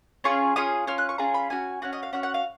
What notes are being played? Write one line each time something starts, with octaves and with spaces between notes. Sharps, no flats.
C#4 F4 G#4 C#6
C#4 F4 G#4 D#6
C#4 F4 F6
F#6
C#6
C#4 F4 G#4 A#5
B5
C#4 F#4 G#5
C#4 F#4 F#5
D#5
F5
C#4 F#4 F#5
F#5
F5